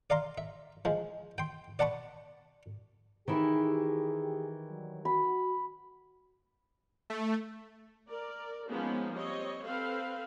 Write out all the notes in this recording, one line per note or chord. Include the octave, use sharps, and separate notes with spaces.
D5 F5 A#5 C6
E5
F3 G#3
G5 C6
D5 F#5 A5 B5 C#6
D#3 E3 E4 G4 G#4
F#3 G3
F#4 B5
A3
A#4 D5
F3 G#3 A#3 B3 C#4 D#4
G3 C4 C#5 D#5
C4 A4 B4 F5